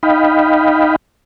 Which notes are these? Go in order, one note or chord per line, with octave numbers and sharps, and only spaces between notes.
D#4 D#5 F5 G5 B5